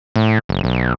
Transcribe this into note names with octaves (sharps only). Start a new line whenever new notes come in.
A2
F#1
B1